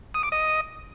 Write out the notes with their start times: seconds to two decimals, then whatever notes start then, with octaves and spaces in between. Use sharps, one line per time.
0.14 D#6
0.23 D6
0.32 D#5